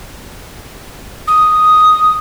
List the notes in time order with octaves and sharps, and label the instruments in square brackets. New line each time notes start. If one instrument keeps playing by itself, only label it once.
[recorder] D#6